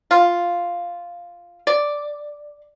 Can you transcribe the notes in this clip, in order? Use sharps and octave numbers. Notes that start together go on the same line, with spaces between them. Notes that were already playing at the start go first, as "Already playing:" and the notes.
F4
D5